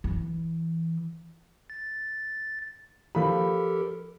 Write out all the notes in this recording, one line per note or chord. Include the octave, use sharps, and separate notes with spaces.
E3
A6
F3 G4 A4 A#4 B5